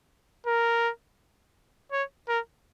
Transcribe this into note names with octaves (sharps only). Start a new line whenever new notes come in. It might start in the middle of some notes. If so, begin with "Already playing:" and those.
A#4
C#5
A#4